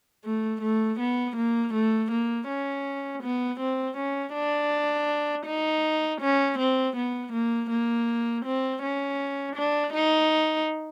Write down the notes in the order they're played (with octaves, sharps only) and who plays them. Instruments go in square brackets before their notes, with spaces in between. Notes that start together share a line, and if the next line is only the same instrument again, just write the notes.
[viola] A3
A3
B3
A#3
A3
A#3
C#4
B3
C4
C#4
D4
D#4
C#4
C4
B3
A#3
A#3
C4
C#4
D4
D#4